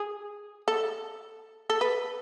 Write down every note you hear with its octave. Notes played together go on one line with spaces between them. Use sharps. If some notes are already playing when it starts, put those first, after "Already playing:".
Already playing: G#4
A4
A4
B4